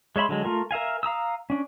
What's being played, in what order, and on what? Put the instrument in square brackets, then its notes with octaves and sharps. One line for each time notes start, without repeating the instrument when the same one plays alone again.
[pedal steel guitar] G#3 C#5 E5 B5 C6
D3 F#3 G#3
A3 F4 A#4
A#4 E5 F5 G#5
F5 A#5 D#6 E6
C#4 D4